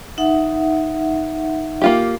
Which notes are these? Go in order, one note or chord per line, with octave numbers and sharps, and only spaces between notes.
D#4 E5 F#5
A#3 F4 G4